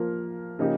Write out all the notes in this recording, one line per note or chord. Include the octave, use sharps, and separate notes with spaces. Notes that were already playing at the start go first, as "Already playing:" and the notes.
Already playing: F3 A#3 F4 A#4
C#3 F3 A#3 D#4 G4